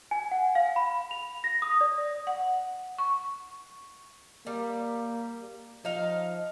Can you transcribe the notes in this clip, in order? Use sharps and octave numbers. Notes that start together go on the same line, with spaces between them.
G#5
F#5
F5
B5
F7
A#6
D#6
D5
F#5
C#6
G3 A#3
F3 D#4 F5